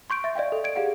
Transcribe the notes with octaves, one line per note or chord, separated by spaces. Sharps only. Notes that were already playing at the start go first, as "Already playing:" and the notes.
C6 C#6 G6 D7
E5 A6
D5 D#5 F5 G5
A4
G#6 D7
G4 G#4 F5 F#5